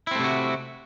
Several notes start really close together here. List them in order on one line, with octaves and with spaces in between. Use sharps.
E4 C4 A3 C3 F#4